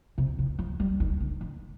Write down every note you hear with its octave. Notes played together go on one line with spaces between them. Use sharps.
C3
D#3
F3
G3
D#3
D3
D#3